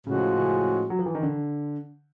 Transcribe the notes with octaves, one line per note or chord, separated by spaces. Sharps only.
A2 C#3 F3 G#3 C#4 F#4
C#3
F#3
F3
E3
D#3
D3